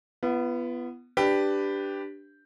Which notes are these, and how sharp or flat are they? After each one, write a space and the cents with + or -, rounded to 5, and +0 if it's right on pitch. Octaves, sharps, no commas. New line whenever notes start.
B3 +0 F4 -45
D4 +0 G4 +0 B4 +15